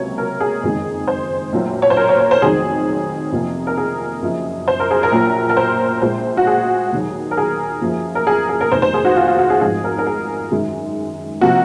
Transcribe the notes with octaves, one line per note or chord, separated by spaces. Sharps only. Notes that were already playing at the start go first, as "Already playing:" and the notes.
Already playing: C#2 C3 F#3 A#3 C#5
A#4
G#4
F#1 F2 D#3 G#3
C5
A#1 A#2 F#3 A#3
C#5
C5
A#4
C#5
C#5
C5
F1 F2 D#3 F#3 G#4
F2 C3 F3 A#3
A#4
G#4
F#1 F#2 F3
C5
A#4
G#4
A#4
A#1 A#2 F#3
A#4
C5
A#1 A#2 G#3 C5
F#4
G#4
D#2 D#3 F#3
A#4
G#4
F#2 F3 A#3
A#4
G#4
G#4
A#4
F1 D#2 D#3 C5
C5
G#4
F#4
F4
F4
F#4
G#4
G#1 G#2 F3 G#4
A#4
A#4
G#4
F#2 D#3 G#3
C3 F3 A#3 F#4